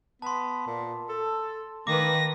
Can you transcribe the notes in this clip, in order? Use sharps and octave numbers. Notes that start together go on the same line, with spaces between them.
B3 A5 C6
A#2
A4
D#3 A#3 B4 D6 A#6